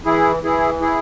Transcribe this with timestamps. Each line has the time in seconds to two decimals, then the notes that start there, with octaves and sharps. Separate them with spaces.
0.05 E3 E4 G#4
0.43 E3 E4 G#4
0.81 E4 G#4